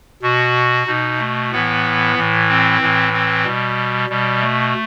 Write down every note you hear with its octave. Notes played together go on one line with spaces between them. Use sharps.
B2 F#4
B2 D#4
A3
A2 E3 B3
A2 E3
C4
A2 E3
C4
B2 G3
B2 G3
A3